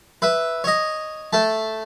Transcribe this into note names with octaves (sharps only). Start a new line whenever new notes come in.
B4 E5
C#5 D#5
A3 A5